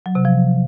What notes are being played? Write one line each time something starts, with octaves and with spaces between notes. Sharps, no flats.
F#3
C3
F3